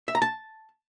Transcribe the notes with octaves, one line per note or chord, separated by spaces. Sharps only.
E5
A#5
A5